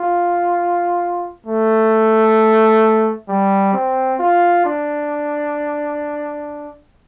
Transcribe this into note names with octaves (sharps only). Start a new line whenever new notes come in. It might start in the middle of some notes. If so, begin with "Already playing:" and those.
Already playing: F4
A3
G3
C4
F4
D4